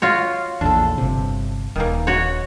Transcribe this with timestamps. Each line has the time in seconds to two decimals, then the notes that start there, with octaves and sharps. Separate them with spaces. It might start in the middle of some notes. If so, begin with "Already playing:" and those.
0.02 F4 F#4 C#5
0.61 A#1 E2 D4 A4
0.98 G1 C3
1.76 D#1 D#3 E3 A#3
2.07 F#4 C#5